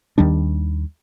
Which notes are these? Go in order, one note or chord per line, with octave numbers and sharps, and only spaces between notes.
D#2 D#3 G3 D4